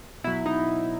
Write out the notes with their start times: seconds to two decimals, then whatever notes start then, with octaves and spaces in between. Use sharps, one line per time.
0.24 B2 F#3 E4
0.46 D#4